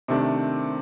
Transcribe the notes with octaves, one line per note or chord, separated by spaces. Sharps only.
C3 D#3 A3 D4